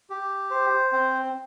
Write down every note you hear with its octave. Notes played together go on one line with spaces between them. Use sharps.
G4
C5
C4